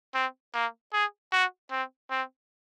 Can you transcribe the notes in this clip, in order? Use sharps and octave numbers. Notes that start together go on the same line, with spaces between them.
C4
A#3
G#4
F#4
C4
C4